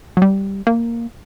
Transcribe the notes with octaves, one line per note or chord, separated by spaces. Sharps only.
F#3
G3
A#3